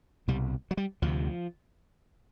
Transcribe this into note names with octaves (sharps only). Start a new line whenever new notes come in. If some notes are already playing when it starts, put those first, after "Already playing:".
C2 B2 G3
F#3
G3
D2 C3 F3